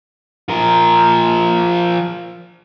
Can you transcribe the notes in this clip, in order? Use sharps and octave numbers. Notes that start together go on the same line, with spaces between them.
F3 A#4